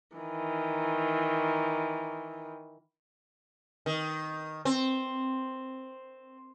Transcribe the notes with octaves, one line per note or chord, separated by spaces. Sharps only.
D#3 E3
D#3
C4